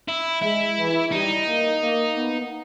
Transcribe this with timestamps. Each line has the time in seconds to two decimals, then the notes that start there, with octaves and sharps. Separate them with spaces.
0.08 E4
0.42 G#3 E4
0.78 E3
1.12 G3 D#4
1.46 A#3
1.81 A#3
2.16 B3